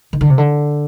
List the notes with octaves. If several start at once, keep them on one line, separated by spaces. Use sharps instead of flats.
D#3
D3
C3
D3